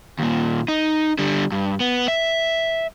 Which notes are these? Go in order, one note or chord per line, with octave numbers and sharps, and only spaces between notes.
D#2 A#2
D#4
D3 G3
G2
B3
E5